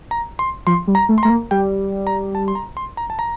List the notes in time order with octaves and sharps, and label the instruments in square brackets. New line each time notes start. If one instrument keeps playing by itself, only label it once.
[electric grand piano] A#5
C6
[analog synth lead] F3 [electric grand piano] C6
[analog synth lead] G3
[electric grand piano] A#5
[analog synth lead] A3
[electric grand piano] C6
[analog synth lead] A3 [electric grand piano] A#5
[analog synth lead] A#3
[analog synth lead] G3 [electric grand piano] G5
[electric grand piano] A#5
A5
C6
A#5
C6
A#5
A5
A#5